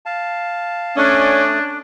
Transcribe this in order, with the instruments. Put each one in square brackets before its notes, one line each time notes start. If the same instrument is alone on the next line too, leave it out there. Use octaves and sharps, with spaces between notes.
[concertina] F5 A5
[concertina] A3 D5 D#6 [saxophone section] C#4 [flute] D4